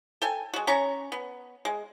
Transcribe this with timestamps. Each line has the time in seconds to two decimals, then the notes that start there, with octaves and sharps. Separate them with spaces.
0.22 A4 G5 G#5
0.54 G#3 F#4
0.67 C#4 A#5 C#6
1.12 B3
1.65 G#3